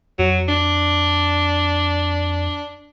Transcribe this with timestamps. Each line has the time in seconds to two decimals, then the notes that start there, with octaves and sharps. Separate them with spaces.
0.19 F2 F#3
0.48 D4